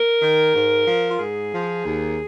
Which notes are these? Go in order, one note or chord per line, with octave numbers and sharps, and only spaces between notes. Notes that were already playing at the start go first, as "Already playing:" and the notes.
Already playing: A#4
D#3
G#2
F3
F4
G#2 G#4
F3
D#2